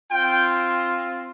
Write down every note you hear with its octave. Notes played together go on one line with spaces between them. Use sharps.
C4 F4 G5